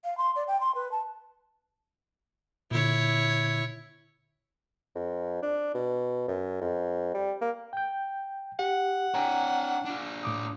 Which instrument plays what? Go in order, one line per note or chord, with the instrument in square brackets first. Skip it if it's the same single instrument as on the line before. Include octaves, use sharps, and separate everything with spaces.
[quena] F5
C6
D5
G5
C6
B4
A5
[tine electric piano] A#2 D3 [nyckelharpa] E4 C#5
[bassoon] F2
D4
B2
F#2
F2
G3
A#3
[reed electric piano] G5 G6
[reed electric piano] G4 [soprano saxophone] F#5
[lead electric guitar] D4 C#5 [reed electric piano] G5 G#5 A#5
[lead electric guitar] D4 F4
[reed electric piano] A2 D6 D#6